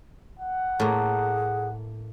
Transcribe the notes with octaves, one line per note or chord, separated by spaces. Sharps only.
F#5
A2 A#3 G#4